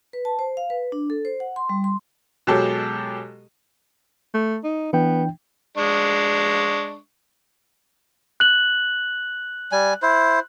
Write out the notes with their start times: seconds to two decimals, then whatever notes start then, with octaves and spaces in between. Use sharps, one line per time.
0.13 B4
0.25 A5
0.39 C5
0.57 F5
0.70 B4
0.92 D4
1.10 A4
1.25 C5
1.40 F#5
1.56 C6
1.69 G3
1.84 C6
2.47 B2 F#3 G#3 G4 A4
4.34 A3
4.64 D#4
4.93 E3 B3 D4 G5
5.77 G#3 D4 C#6
8.40 F#6 F#7
9.72 G3 G#5
10.02 E4 C5